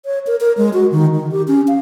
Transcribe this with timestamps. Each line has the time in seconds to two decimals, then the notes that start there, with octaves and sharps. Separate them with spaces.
0.05 C#5
0.27 A#4
0.41 A#4
0.58 G#3
0.74 F#4
0.92 D#3
1.14 D#3
1.31 G4
1.48 C#4
1.68 F5